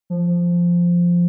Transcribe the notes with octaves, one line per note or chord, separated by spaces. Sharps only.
F3